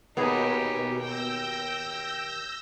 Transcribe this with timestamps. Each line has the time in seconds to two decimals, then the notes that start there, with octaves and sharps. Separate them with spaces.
0.17 D#2 B2 B3 D#4 G4 G#4
1.00 G5 E6 G6 A#6